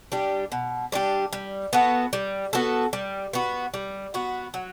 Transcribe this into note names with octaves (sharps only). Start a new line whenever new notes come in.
G3 D4 G4
B2
G3 D4 G4
G3
B3 F#4 A4
G3
B3 F#4 A4
G3
B3 F#4
G3
B3 F#4
F#3